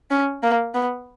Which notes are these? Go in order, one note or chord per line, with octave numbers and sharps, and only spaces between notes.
C#4
A#3
B3